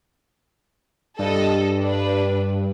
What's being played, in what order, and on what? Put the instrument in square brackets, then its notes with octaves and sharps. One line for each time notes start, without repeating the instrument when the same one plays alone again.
[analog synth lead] G2 [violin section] A4 D#5
[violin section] D4 B4